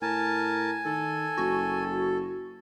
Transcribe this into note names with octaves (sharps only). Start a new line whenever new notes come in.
A2 A#4 G#5 A5
D#3 A4
F#1 F#4